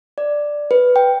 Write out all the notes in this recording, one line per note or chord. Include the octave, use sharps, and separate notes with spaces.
D5
B4
G5